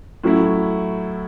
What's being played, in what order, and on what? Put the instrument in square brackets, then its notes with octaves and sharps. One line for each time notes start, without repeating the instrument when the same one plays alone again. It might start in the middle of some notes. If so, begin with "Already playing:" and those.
[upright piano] A2 F#3 C#4 E4